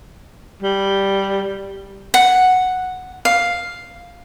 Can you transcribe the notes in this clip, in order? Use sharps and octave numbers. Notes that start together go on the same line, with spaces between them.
G3
F#5
F5